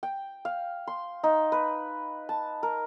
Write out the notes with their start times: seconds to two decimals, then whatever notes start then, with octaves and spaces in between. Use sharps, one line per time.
0.03 G5
0.45 F5
0.87 C6
1.24 D#4
1.52 B4
2.29 A5
2.63 A#4